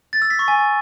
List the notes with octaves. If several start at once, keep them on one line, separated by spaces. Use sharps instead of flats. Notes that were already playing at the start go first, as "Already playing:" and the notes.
A6
E6
B6
C#6
G#5